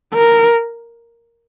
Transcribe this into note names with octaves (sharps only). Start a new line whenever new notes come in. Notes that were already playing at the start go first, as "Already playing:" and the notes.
A#4